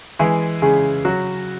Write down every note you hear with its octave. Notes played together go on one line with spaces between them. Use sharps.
E3 G#3 G#4
C#3 G#3 G#4
F#3 F#4